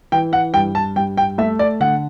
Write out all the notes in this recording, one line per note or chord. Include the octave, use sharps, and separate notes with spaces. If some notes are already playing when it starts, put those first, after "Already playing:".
E3 G5
F#5
G2 G5
A5
G2 G5
G5
A3 E5
D5
D3 F#5